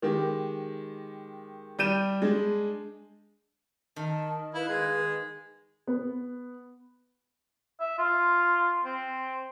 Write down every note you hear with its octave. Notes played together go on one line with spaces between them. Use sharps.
D#3 G#3 G4
G3 G6 D#7 E7
G#3 D4
D#3 A5
E4 B4 F5
G#3
B3
E5
F4
C4